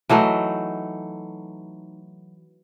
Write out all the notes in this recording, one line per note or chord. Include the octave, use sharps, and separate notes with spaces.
E3 F#3 A3 D#4